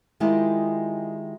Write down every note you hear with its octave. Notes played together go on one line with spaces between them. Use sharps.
D#3 G#3 E4 F4 G4